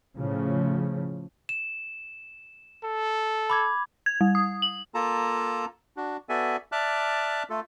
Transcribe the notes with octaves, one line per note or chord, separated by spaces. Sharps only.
A2 C#3 F3
E7
A4
B5 D6 G#6
G#6
G3
D#6
F#7
A#3 F4 A4 A5 A#5
D4 F#4
B3 F#4 A4 D5 E5 G#5
D5 E5 A5 D6 F6 F#6
A3 F4 A4